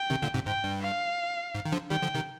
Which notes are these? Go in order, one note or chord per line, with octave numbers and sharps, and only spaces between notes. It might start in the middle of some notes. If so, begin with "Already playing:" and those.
Already playing: G5
C3 D#3
A#2 D3
G#2 C3
G#2 G5
G2
F5
G#2
D#3
D3 F3
D#3 G3 G5
D3 F3
C3 D#3